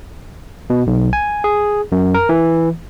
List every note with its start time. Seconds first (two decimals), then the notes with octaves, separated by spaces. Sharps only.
0.70 B2
0.87 B1
1.13 G#5
1.44 G#4
1.92 F#2
2.14 A#4
2.29 E3